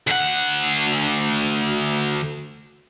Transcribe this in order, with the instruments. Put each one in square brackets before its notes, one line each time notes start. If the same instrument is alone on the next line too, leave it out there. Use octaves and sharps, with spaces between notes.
[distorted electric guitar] D2 F#5